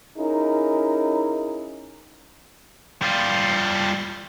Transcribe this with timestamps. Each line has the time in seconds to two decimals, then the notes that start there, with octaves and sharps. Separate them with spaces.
0.17 C#4 D#4 E4 G#4 A#4
3.02 G3 F4